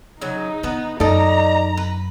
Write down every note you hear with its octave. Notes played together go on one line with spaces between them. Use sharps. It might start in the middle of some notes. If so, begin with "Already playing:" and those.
C#3 F#3 D#4
D3 B3 B4
F#2 D#4 A4 D5 D#5 A#5
B4